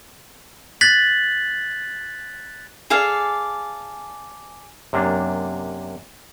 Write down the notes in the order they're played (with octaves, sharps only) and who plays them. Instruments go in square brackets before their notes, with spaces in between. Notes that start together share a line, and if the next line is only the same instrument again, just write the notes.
[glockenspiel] F#6 G#6 A6 B6 F#7
[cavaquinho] G#4 A4 D5 F5
[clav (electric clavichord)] F#2 C3 A#3 D4